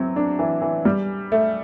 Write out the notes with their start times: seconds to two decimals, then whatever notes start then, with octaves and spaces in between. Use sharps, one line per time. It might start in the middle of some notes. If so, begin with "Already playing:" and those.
Already playing: E3 F#3 C4
0.16 D4
0.39 E3
0.62 E3
0.85 G3
1.32 A3